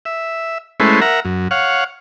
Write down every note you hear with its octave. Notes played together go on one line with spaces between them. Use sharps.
E5
G#3 A3 C#4 E4 B4 C5
A#4 E5 F#5 A#5
F#2
C#5 F5 F#5